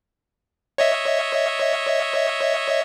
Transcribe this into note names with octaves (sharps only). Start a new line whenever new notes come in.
C#5 D#5 E5